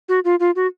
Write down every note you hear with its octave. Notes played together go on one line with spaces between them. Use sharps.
F#4
F4
F4
F#4